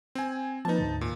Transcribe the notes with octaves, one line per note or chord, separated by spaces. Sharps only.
C4 G#5
F3 A#3 D#4 B4 A5
D2 G#2 D3
A#2